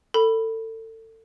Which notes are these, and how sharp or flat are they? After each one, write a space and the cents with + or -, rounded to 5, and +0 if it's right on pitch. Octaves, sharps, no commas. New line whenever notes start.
A4 +30 B5 +0